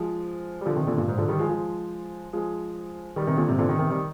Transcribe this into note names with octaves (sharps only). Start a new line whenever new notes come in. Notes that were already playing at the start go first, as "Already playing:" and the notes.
Already playing: F3 G#3
G3
D3 F3
C3 D#3
A#2 D3
G2 A#2
G#2
D3 F3
D#3 G3
F3 G#3
F3 G#3
F3 G#3
D#3 G3
C3 D#3
A#2 D3
G#2 C3
A#2 D3
C3 D#3
C3 D#3
D#3 G3